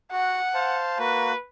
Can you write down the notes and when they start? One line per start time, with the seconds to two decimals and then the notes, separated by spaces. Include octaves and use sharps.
0.12 F#4 F#5
0.54 C5 F5 A5
1.00 A#3 F#4 B4